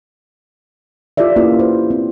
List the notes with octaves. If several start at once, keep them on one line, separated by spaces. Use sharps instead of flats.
F4 G4 A4 D5 E5
A#3 C#4 E4 F4 G4 B4
B4 C5
C4